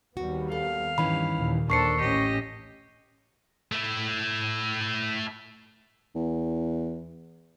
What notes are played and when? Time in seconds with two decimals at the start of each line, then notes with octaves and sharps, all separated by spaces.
0.17 D#2 G3 B3 F#4
0.52 A4 F5
0.98 G2 D#3 E3 C#4 B5
1.39 D#2 A#2
1.70 D#2 A#3 D4 A4 C5 C#6 C7 C#7
2.00 A1 C#4 G4 D#5
3.72 A3 E4
6.15 E2